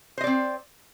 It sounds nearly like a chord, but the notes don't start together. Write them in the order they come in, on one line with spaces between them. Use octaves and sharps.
C5 D#5 D5 C4